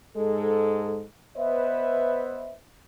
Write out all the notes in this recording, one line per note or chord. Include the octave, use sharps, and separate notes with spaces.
G#2 G#3 A4
B3 B4 C5 D#5 E5